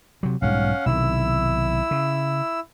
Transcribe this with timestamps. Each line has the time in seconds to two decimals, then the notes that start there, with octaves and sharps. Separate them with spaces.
0.23 C3 F#3
0.42 B1 G#2 G3 C#4 F5 F#5
0.86 B1 C3 D#3 E4 E6
1.91 C#3